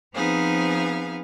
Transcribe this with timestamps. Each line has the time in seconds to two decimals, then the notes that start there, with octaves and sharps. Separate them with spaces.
0.14 F3 B3 C4 D#4 G#4 F5